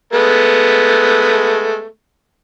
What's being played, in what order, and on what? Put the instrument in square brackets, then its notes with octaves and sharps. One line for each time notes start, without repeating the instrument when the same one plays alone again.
[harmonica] G#3 A3 B3